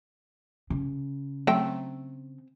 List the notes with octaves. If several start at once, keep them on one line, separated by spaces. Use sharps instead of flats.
C#3
F#3 A3 C4 E5 G5